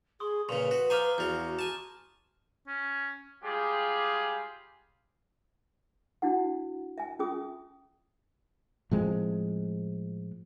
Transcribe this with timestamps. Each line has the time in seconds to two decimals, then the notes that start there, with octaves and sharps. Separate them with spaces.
0.20 G#4 C6 C#6 D#6
0.49 A#2 C#3 B4 C6 C#6 F7
0.71 F#4
0.90 F4 C5 G#5 A#5 D6 F6
1.18 E2 F4 F#4 G6
1.59 G#5 A5
2.67 C#4
3.43 G3 G#3 F4 G4 G#4
6.22 D4 E4 F#4 F#5
6.98 E5 G#5
7.19 C#4 F4 G#4 D#6
8.91 A2 F3 G#3 C4